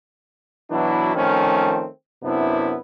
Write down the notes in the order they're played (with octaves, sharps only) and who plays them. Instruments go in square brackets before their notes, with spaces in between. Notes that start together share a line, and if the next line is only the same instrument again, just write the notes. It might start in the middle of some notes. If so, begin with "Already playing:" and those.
[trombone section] B2 E3 F#3 D4 E4
D#3 F3 A3 C4 C#4
F#2 C3 B3 D4 E4